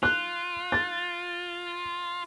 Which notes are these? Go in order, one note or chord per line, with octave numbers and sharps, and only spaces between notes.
F4 F#6
A6